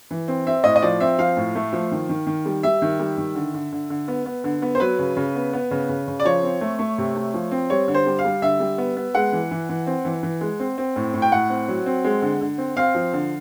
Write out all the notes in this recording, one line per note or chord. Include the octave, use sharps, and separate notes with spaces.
E3
C4
C4 E5
A2 D#5
D#5
F3 D5
C4 E5
F3 F5
A2
A3
F3
D#3
D#3
D#3
G3
G3 E5
D#3
G3
D#3
D3
D3
D3
D3
B3
B3
D3
B3
C5
F#3 B4
C#3
C#3
B3
B3
C#3
C#3
C#3
D5
F3 C#5
C4
A3
A3
C3
A3
F3
C4
G3 C#5
D3
C5
G3
F5
G3
D3 E5
G3
B3
B3
G#3 F#5
E3
E3
E3
C4
E3
E3
G#3
C4
C4
A2
A2
G5
A2 F#5
C4
F#3
C4
G#3
D3
D3
C4
C4 F5
F3
D3